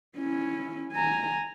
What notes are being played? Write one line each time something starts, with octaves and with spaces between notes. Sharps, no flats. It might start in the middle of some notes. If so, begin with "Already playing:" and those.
C#4 E4
G#5 A#5